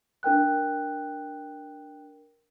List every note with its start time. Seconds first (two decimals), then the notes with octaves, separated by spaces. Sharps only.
0.23 D4 A#4 G5 F#6